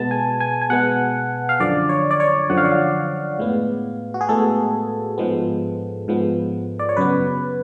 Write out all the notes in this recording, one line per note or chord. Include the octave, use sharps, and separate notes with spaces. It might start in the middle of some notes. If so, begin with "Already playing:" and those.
Already playing: B2 G#3 B3 A5
G#5
G#5
G#5
B2 G#3 B3 F#5
F5
F#2 D3 F3 D5
C#5
D5
C#5
F#2 D3 F3 F#5
F5
D5
F5
A2 G#3 B3
F#4
G#4
A2 G#3 B3 A4
G#2 F3 G#3 B3
G#2 F3 G#3 B3
D5
C#5
F#2 C#3 F#3 B3 B4